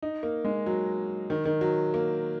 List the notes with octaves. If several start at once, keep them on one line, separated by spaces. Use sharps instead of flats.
D#4
A#3
G#3
F#3
D#3
D#3
F#3
A#3